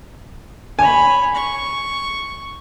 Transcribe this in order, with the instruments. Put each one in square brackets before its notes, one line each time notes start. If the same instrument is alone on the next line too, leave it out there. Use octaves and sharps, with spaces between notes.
[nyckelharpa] C#5 B5 [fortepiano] G#5
[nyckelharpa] C#6